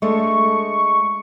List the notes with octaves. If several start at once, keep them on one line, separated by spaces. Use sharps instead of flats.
G#3 A3 D4 C#6